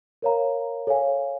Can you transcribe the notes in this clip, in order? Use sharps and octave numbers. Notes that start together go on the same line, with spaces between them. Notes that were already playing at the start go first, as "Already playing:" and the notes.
A#4 C#5 F5 A#5
A4 C#5 F5 G#5